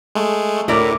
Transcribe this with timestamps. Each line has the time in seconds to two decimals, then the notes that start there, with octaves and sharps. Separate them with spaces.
0.15 G#3 A3
0.68 D2 A2 E4 A#4 D5